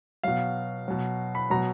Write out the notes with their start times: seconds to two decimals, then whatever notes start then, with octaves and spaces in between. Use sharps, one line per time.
0.23 B2 F#3 F5
0.88 B2 F#3
1.35 B5
1.50 B2 F#3 A#5